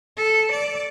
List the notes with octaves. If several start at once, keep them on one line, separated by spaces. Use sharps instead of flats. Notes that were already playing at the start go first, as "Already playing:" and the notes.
A4
D5